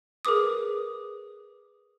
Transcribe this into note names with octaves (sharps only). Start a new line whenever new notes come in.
G#4 A#4 B4 D6 D#6